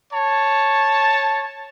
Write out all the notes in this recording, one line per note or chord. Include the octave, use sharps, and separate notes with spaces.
C#5 A5